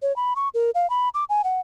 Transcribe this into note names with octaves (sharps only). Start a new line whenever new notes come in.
C#5
B5
C#6
A#4
F5
B5
D6
G#5
F#5